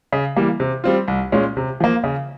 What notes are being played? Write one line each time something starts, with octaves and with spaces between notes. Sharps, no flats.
C#3
E3 G3 A#3
C3
G3 C4 F4
C2
A#2 G#3 C#4
C3
F3 A#3
C#3